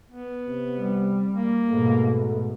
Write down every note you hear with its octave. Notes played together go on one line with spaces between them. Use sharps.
B3
C3
G3
A#3
G#2 B2 A3